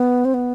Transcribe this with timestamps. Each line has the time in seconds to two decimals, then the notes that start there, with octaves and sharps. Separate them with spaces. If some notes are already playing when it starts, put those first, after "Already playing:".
Already playing: B3
0.25 C4
0.34 B3